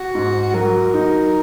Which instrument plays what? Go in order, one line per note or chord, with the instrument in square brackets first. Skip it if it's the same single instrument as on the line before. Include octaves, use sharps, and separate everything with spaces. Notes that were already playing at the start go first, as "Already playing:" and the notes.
Already playing: [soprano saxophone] F#4
[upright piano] G#2
[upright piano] F#3 [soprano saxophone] A#4
[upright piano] D#4